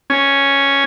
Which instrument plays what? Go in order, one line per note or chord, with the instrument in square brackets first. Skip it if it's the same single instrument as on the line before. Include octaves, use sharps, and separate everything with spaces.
[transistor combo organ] C#4